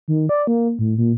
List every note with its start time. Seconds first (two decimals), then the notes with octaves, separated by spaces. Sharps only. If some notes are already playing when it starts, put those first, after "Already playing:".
0.08 D#3
0.29 D5
0.47 A#3
0.79 A2
0.98 A#2